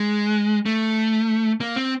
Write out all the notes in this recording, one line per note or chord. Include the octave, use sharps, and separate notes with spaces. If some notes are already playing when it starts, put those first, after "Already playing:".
Already playing: G#3
A3
A#3
C4